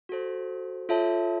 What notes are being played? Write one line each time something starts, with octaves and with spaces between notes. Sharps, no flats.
F#4 A4 C5
F4 A4 C#5 E5 A5